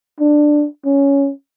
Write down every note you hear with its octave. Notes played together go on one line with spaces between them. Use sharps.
D4
C#4